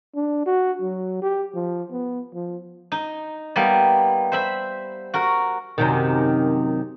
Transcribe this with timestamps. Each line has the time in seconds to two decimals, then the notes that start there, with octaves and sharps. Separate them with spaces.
0.16 D4
0.46 F#4
0.82 F#3
1.22 G4
1.54 F3
1.92 B3
2.34 F3
2.92 D#4
3.56 G3 A#3 B3
4.32 C5 E5 B5
5.14 F#4 A#4
5.78 F#2 C3 D#3